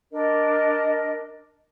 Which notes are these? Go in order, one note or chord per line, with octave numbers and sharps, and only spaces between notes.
D4 A#4 D#5